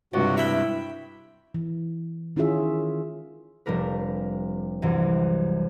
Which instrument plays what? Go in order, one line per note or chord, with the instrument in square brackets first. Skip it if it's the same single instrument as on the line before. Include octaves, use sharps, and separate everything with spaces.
[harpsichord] C#2 [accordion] G2 C3 [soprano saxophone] F#4
[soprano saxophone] E4 [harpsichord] E5 G5 B5
[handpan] E3
D#3 C#4 E4 F4 G#4 E5
[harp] F1 G3 D4 A#4 B4
C2 F#2 E3